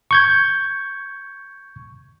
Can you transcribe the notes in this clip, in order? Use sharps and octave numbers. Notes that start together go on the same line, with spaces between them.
C#6 G6 G#6